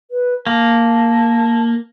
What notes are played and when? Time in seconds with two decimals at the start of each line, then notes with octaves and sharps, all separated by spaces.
0.11 B4
0.47 A#3 A5